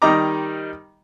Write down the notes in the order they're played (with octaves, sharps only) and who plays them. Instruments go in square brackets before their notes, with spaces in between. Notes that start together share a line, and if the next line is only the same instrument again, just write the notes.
[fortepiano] D#3 G3 D#4 D#5 A#5 D6